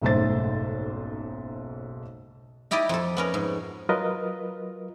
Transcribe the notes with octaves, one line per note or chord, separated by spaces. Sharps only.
F#1 B1 G#2 A3 C5 A6
D#4 E4 G4 D5 D#5
F2 A4
B3 C#4 A#4
G#2
F#3 F4 A#4 B4 D#5